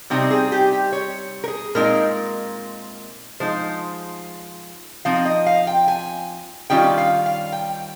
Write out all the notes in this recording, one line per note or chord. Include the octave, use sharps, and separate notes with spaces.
C3 G3 C4 D#4 C5
G#4
G4
G4
C#5
A#4
G#4
A#2 G#3 C4 D#4 A#4
F3 G#3 D#4 C5
F3 C4 D#4 F5
D#5
F5
G5
G#5
D#3 G3 C#4 F4 G5
F5
F5
G5